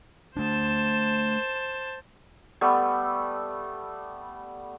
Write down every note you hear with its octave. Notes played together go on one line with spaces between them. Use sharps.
A3 D4 C5 A5
G3 A3 B3 E6